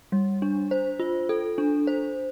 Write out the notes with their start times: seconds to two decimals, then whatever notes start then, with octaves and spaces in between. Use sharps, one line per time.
0.12 G3
0.42 D4
0.71 C5
1.00 F4
1.29 A4
1.58 D4
1.87 C5